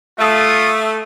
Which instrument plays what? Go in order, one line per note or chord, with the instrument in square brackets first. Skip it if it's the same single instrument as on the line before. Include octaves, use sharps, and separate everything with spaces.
[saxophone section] A3 [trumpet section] F4 D#6